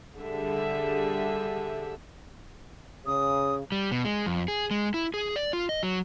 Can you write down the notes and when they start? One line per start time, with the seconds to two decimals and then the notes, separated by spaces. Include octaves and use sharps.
0.17 D3 G3 G4 G#4 E5
3.06 C#3 D#6
3.72 G3
3.91 B2
4.05 G#3
4.26 F2
4.48 G#4
4.71 G#3
4.94 E4
5.14 G#4
5.36 D5
5.53 F4
5.69 D#5
5.83 F#3